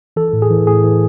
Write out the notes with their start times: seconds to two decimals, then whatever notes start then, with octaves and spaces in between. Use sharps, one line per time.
0.16 E3 A4
0.33 A2
0.42 G#4
0.50 E3
0.67 A2 G#4
0.84 E3